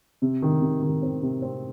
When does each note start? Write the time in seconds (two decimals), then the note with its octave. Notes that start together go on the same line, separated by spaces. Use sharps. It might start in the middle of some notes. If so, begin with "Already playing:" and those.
0.22 C3
0.42 D#3
0.61 C3
0.83 D#3
1.03 C4
1.22 C3
1.42 C4